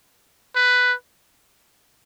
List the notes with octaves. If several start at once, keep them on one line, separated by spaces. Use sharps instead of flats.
B4